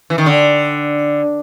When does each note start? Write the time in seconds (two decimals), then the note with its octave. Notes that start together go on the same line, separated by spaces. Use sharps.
0.10 E3
0.18 D#3
0.26 D3